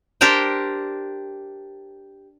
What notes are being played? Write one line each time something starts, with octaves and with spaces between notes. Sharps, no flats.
D4 G4 A#4 C5 G5